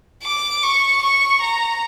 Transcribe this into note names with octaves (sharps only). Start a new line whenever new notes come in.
D6
C#6
C#6
A#5